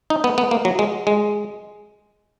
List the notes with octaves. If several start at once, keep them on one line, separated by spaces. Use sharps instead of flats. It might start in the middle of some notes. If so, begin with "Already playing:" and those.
D#4
B3
B3
A#3
F#3
G#3
G#3